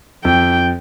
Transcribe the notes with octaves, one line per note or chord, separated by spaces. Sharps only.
F2 G5